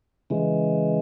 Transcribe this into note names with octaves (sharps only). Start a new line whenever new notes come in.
C#3 E3 G#3